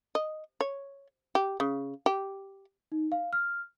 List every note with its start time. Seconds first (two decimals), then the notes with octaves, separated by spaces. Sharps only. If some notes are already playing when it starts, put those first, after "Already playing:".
0.15 D#5
0.61 C#5
1.35 G4
1.60 C#3
2.06 G4
2.92 D#4
3.12 F5
3.33 F6